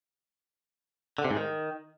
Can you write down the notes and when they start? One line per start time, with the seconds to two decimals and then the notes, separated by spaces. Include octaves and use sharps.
1.18 D3
1.25 C3
1.31 G#2
1.37 D#3